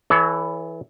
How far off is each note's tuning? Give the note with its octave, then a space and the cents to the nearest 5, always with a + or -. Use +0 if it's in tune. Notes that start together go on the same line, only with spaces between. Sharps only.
E3 +0 A4 -35 C#5 +30